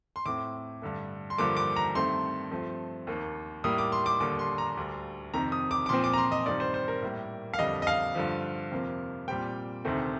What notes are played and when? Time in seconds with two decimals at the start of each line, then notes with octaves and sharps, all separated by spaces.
0.16 C6
0.26 A2 A3 C4 D6
0.82 G2 D3 A3
1.30 C6
1.38 G2 D3 F3 A#3 D6
1.57 D6
1.76 A#5
1.95 G2 D#3 A3 C4 C6
2.51 G2 F3 A3 C4
3.07 D#2 D#3 A#3
3.64 A2 G3 A#3 D#6
3.78 D6
3.92 C6
4.06 D6
4.20 D#2 D3 G3 A#3 D6
4.39 C6
4.58 A#5
4.77 D2 D3 G3
5.34 F2 C3 D#3 A#5
5.52 D#6
5.71 D6
5.86 D6
5.89 A#2 F3 C4 C6
6.04 D6
6.14 A#5
6.18 C6
6.32 D#5
6.46 G2 D#3 G3 C4 D5
6.60 C5
6.74 C5
6.88 A#4
7.02 A2 G3 A#3
7.54 F5
7.59 F2 D3 G3 D#5
7.82 D#5
7.87 F5
8.15 G2 D3 F3
8.71 F2 C3 F3 A#3
9.28 A#2 G3 C4 G5
9.85 D2 C3 D#3 A3 C4